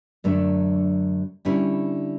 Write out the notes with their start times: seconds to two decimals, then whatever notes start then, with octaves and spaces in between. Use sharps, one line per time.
0.24 F#2 D3 F#3 A3 D4
1.45 D3 G3 C#4 E4